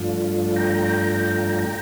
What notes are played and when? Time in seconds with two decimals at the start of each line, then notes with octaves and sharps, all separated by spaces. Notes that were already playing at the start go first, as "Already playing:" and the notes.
Already playing: G2 F3 A3 D4 F4
0.56 G5 A#5